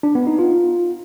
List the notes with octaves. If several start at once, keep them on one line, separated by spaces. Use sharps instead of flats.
D4
B3
D#4
F4